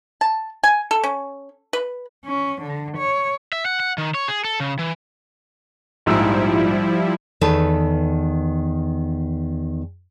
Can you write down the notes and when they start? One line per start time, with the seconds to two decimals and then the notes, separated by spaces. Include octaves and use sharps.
0.21 A5
0.63 G#5
0.91 A4
1.04 C#4
1.73 B4
2.25 C#4
2.62 D3
2.98 C#5
3.52 E5
3.66 F#5
3.80 F#5
3.98 D#3
4.14 C#5
4.28 G#4
4.44 A4
4.60 C#3
4.79 E3
6.06 A#1 G#2 F3 G3 E4 E6
7.41 E2 D#3 A4 B4 A5